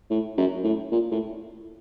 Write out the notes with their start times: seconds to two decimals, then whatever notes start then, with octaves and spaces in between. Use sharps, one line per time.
0.10 A2
0.37 F#2
0.64 A2
0.92 A#2
1.12 A2